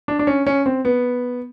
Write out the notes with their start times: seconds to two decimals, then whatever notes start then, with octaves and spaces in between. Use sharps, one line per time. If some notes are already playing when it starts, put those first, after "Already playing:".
0.08 D4
0.19 D4
0.27 C#4
0.47 C#4
0.66 C4
0.85 B3